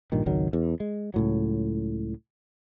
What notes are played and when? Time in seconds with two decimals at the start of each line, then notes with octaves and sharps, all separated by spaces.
0.12 A#1 G2 A#2 D#3
0.26 G#1 C#2 D#3 F#3
0.53 E2
0.80 G#3
1.14 C#2 A2 F#3